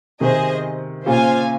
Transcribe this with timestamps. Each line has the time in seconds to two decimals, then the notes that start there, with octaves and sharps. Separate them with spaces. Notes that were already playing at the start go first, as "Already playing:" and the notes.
0.20 C3 D#3 G#4 C5 D#5
1.06 A#2 C#3 F4 C5 F5 G#5